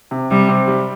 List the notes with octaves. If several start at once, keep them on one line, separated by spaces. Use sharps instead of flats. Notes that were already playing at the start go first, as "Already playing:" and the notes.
C3
C3 G3
C4
G3